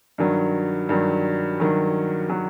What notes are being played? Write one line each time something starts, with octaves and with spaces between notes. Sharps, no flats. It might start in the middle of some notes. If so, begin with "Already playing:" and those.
G2 D#3 F#3
G2 D#3 F#3
G2 D#3 F#3
D#3 F#3